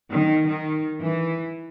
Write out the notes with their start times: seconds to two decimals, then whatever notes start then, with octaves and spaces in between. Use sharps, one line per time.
0.12 D#3
0.48 D#3
1.00 E3